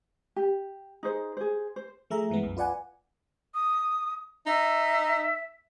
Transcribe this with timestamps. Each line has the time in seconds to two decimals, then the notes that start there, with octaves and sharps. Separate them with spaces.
0.36 G4
1.03 D#4 G#4 C5
1.37 G#4 C5
1.76 C5
2.10 F3 A3 G#4 E5 A#5
2.30 G2 E3 G#3 B3
2.43 C2 F#2
2.57 F4 B4 D5 F#5 G#5
3.54 D#6
4.46 D#4 E5